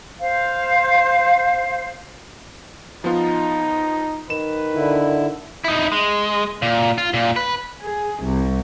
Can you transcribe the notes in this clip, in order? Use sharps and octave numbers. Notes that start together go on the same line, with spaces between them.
C5 F5
F3 B3 D#4 F4
D#3 B4 E7
D3 E4
D#4 E4
G#3
A#2
F4
A#2
B4
G#4
C2